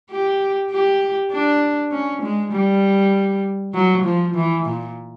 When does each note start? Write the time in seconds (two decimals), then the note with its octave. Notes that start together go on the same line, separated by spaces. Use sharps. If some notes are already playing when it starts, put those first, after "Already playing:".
0.11 G4
0.71 G4
1.31 D4
1.92 C#4
2.22 G#3
2.53 G3
3.74 F#3
4.04 F3
4.35 E3
4.65 A#2